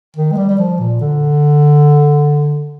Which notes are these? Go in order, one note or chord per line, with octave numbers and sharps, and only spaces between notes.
D#3
G#3
G3
G3
F3
A#2
D3